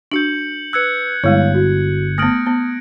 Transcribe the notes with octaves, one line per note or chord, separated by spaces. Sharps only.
D4 F#4 G6 C#7 F#7
B4 E6 F#6 G#6 C#7
G1 G3 G#3 E4 C#5 F5 F#6
F#4
A3 B3 D#6 F6 A#6 D7 F#7
B3